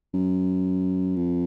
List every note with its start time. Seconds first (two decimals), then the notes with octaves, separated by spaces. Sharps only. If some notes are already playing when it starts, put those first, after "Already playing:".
0.14 F#2
1.16 F2